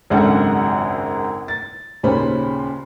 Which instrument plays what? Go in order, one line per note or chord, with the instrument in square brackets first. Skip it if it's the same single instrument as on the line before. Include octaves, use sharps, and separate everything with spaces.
[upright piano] G#1 C#2 F#2 D4 A4 F#5
A6
D#2 A#2 C#3 C#4 C5 B5